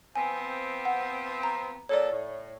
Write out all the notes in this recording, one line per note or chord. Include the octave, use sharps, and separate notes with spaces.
F3 B3 C4 G#5
F#5
A#5
A#2 A4 C#5 D5
A2